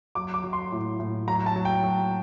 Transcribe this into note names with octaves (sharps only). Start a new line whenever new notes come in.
F#3 D6
D6
F#3
C6
A2
A2
F#3 A#5
A5
F#3
G5
F#3